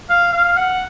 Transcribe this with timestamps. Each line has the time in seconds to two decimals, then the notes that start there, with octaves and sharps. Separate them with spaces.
0.09 F5
0.33 F5
0.57 F#5